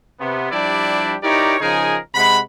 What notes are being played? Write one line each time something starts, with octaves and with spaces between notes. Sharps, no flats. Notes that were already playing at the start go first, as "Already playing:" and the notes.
C3 B3
F3 G3 D4 E4 G4 D5
D#4 E4 G4 A#4 C#5 D5
C#3 F3 D#4 G#4 A#4 G#5
C3 G#3 F#5 B5